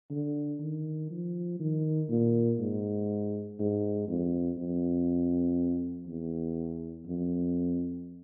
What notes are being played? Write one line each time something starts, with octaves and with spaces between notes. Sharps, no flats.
D3
D#3
F3
D#3
A#2
G#2
G#2
F2
F2
E2
F2